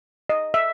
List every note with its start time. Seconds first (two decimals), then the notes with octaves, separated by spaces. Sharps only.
0.29 D#5
0.54 E5